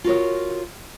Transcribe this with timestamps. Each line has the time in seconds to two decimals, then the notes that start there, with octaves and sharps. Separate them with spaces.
0.04 F4 F#4 A#4 C#5